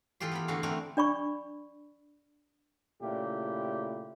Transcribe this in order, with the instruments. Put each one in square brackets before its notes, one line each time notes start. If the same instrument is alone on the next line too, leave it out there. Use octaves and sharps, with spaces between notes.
[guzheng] E3 A3 F4 G4 C6
B3 A#4 B5
D3 E3 A3 F#4 F5
A3 C4 D4 A#4
[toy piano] D4 D5 B5 C#6
[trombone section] A#2 C#3 A3 E4 G4